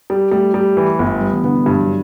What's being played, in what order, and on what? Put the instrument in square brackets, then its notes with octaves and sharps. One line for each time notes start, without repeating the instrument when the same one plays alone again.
[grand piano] G3
[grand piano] G3 [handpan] A3
[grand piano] G3
E3
G1
[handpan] G3 [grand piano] B3
[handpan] E3
[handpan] D3 [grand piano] B3
[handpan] D3
[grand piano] G2 [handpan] D3
[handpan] F#3